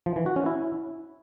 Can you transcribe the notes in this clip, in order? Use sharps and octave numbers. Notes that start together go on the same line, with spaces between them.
F3
E3
F#4
C#4
E4